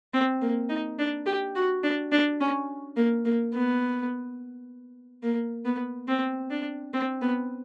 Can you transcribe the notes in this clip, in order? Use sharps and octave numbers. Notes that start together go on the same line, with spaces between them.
C4
A#3
D#4
D4
G4
F#4
D4
D4
C#4
A#3
A#3
B3
A#3
B3
C4
D4
C4
B3